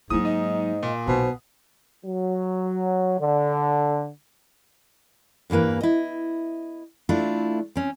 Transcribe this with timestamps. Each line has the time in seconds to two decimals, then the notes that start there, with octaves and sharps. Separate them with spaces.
0.10 G#2 F#3 A#3 E4 D#6
0.25 D#4 D#5
0.83 A#2
1.08 B1 B2 C5
2.05 F#3
3.20 D3
5.50 E2 G2 E3 A#3 B4
5.81 E4 D#5
7.09 A3 D4 E4 F4
7.76 C4 C#4